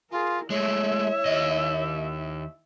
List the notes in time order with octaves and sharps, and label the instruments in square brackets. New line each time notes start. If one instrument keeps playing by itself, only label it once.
[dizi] F4 [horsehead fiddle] G#4 A#4
[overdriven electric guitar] G#3 A3 [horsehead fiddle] E4 E5 [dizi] C#5
[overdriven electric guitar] D#2 D#5